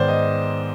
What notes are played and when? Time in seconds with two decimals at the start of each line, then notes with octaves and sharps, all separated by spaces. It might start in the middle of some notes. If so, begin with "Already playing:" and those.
Already playing: G#2 D#3 B3 C5 D5
0.08 D#5